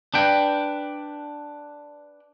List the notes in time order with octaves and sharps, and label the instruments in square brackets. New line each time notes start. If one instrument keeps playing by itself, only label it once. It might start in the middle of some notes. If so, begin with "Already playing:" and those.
[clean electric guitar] D4 B4 G5